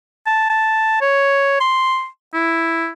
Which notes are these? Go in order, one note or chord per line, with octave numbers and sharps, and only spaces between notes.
A5
A5
C#5
C6
E4